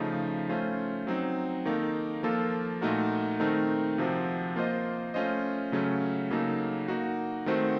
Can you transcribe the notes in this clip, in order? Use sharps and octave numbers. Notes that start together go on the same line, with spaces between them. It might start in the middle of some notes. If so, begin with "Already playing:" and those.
Already playing: C#3 F3 A3 D#4
A3 C#4 F4 C5
F#3 C4 D#4
D#3 A#3 D#4 A4
F3 A#3 F4 A4
A#2 A3 D#4 F#4 A#4
D#3 A3 C4 D#4 A#4
C3 F3 C4 F#4
A#3 F4 C5 D#5
A3 C#4 F4 C5 D#5
C#3 F#3 A3 C#4
C#3 F#3 A#3 D#4 A4
A#3 D#4 F#4
D#3 A3 C4 F#4 C5